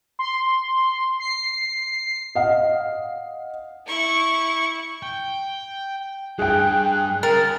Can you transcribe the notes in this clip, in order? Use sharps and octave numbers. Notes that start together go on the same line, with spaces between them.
C6
C7
D#5 F5 F#5
E4 C#6
G5
G2 G#4 G5 F#6
C#3 A#4 A6